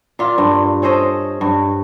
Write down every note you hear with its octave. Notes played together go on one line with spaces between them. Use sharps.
A#2 F4
G2
C#4 A4 C5 D#5
G2